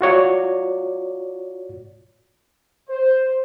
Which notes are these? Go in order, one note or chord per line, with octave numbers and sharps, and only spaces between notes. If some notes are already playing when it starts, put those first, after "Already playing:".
F4 F#4 C#5 D5
C5